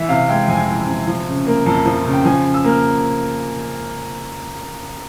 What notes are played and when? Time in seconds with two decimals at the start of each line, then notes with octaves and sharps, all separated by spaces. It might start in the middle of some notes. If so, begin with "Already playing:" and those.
Already playing: E3 E5
0.09 C3 F5
0.29 G#3 G5
0.48 F2 G#5
0.69 E3
0.88 C3
1.07 F3
1.27 C#3
1.47 A#3
1.66 F2 A5
1.85 F3
2.05 C#3
2.13 G5
2.25 F3 G#5
2.44 C#3
2.54 E6
2.65 A#3 F6